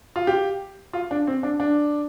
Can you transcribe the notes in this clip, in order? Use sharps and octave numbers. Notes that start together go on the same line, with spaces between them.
F4
G4
F4
D4
C4
D4
D4